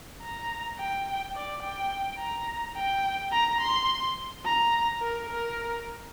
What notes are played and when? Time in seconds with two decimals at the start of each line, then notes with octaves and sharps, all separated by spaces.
0.22 A#5
0.79 G5
1.36 D5
1.63 G5
2.20 A#5
2.76 G5
3.32 A#5
3.61 C6
4.45 A#5
5.01 A#4
5.30 A#4